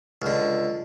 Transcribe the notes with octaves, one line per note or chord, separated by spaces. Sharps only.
C#2 D3